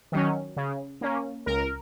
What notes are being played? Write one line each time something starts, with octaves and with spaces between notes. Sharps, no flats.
D#3 F#3 C#4
C#3
A#3 C#4
C#2 A#4